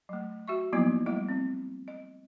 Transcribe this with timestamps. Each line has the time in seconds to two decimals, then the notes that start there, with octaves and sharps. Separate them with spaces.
0.09 F#3 A3
0.48 F#4 E5 C#6
0.73 F3 F#3 A#3 B3 D#4 E4
1.06 G3 A3 E4 D#5
1.29 C4
1.88 D#5